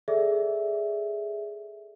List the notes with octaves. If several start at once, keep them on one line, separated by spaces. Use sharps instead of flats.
G#4 A4 D5 E5